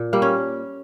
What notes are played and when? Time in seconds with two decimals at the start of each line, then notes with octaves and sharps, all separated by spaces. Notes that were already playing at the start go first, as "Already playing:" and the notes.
Already playing: A#2
0.13 G3 A#3
0.22 C#4